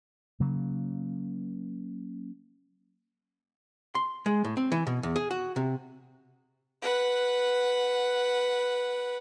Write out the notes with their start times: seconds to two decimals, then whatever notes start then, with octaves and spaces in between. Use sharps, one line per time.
0.40 C#3 F#3 A#3
3.95 C6
4.26 G#3
4.44 A2
4.57 C4
4.72 E3
4.87 B2
5.03 E2
5.16 G#4
5.31 F#4
5.56 C3
6.82 B4 F#5